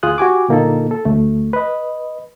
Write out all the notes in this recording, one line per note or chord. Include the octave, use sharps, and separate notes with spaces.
D2 F4 G#4 D#6 F#6
F#4 G4 G#5 D6
A#2 D3 A#3 D#4 F4 A4
A4
D2 A3
B4 D#5